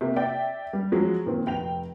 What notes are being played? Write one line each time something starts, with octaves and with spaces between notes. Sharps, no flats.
C3 A#3
D5 E5 G5
G3
F3 F#3 G#3
A#2 D#3 C4
F1 G5 F7